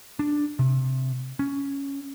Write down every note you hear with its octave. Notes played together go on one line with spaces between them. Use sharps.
D4
C3
C#4